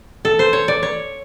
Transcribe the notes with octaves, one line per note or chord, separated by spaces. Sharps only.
A4
C5
C#5
D5
C#5